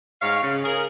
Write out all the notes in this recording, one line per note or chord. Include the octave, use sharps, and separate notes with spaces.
G#2 C#5 F5
C#3
G#4 A#4